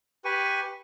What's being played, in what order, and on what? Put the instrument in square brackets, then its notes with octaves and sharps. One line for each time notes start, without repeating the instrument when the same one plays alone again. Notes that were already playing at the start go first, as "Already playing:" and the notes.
[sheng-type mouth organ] G4 B4 G#5 C#6